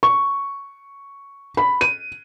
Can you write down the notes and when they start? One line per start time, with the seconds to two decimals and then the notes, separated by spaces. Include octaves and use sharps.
0.03 C#6
1.57 B5
1.81 D#7